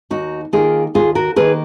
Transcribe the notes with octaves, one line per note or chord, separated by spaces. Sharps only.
D#2 D#4 F#4
D#3 A#3 F4 G#4
D#2 F4 G#4
F#4 A#4
D#3 A#3 G#4 B4